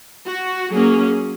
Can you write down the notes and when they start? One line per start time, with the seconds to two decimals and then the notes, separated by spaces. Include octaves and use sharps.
0.26 F#4
0.70 F#3 A#3 C#4 G#4